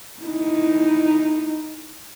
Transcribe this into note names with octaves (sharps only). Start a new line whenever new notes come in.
D#4 E4